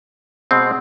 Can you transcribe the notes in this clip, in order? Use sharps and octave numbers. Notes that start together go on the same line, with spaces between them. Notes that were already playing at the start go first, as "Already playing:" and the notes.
B2 G#3 C4